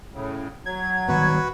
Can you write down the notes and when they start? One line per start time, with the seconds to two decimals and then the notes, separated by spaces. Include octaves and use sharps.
0.14 A2 C#3
0.66 F#3 G#6
1.09 D#3 G3 B3 F#4 B4